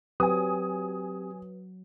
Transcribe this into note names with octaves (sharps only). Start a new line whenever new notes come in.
F#3 C4 G4 B4 G#5 D#6